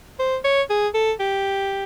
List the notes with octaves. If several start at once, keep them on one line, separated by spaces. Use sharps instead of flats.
C5
C#5
G#4
A4
G4